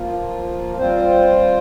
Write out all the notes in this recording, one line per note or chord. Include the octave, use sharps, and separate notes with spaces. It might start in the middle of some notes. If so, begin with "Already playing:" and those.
Already playing: F3 A#3 F4
G3 C4 F4 C5